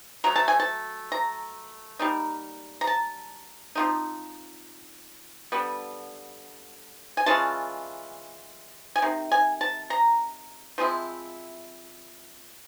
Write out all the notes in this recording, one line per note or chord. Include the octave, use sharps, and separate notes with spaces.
F#3 A3 A#5
A5
G#5
A5
A#5
G3 A#3 D#4
A#5
A5
F3 A3 C4 D#4
D3 G3 B3
G#5
E3 G#3 C#4 F4 A5
G#5
C3 D#3
G#5
A5
A#5
F3 G#3 C4 E4